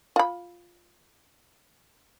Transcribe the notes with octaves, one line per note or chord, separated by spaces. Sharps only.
F4 B5